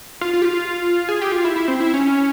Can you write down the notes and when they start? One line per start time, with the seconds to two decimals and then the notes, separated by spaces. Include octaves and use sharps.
0.21 F4
0.33 F4
0.42 G4
0.45 F4
1.09 G#4
1.21 G4
1.32 F4
1.45 E4
1.56 E4
1.68 C4
1.80 E4
1.94 C#4